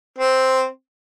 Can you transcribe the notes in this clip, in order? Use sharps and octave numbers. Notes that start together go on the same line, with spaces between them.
C4